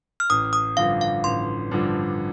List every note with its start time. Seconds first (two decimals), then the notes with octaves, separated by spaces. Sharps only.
0.20 F6
0.30 A1 D#6
0.53 D#6
0.77 G2 D3 F3 F5
1.01 F5
1.24 A1 C6
1.71 G2 D3 F3